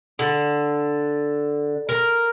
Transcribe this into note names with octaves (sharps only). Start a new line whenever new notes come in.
D3
A#4